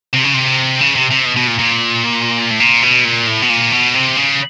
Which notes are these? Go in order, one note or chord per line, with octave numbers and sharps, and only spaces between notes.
C3
C#3
C3
C#3
C3
C3
B2
B2
A#2
A#2
A2
A#2
B2
A#2
A2
B2
A#2
B2
C3
C#3